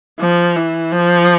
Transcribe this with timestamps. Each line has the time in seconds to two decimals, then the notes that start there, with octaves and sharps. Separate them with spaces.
0.20 F3
0.56 E3
0.92 F3